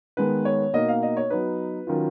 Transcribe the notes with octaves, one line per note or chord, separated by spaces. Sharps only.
D#3 G#3 B3 B4
C#5
B2 A#3 D#4 D#5
F5
D#5
C#5
F#3 B3 D#4 B4
D#3 F#3 C#4 F4